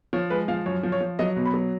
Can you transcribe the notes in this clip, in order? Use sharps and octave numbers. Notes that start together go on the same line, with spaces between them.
F3 C#5
G#3 B4
F3 F5
F#2 C#5
F3
C#5
F3
F#3 D#5
B2
B5
F#3